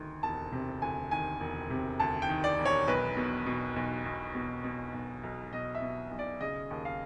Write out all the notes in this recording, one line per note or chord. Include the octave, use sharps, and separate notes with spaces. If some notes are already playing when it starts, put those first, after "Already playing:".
Already playing: D2 D#3
E1 A5
C3
D2 G#5
D#3 G#5
E1
C3
D2 A5
G5
D#3
D5
E1
C#5
B1 B4
B2
B2
B1
B1
B2
B2
B1
B1
B2 D#5
E5
B2
B1
D5
C#3 D#5
D#2
F5